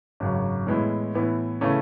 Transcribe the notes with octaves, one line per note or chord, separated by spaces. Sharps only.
G#1 F#2 C#3 F#3
A2 E3 G#3 B3 E4
A2 E3 B3 E4
C#3 E3 A3 C#4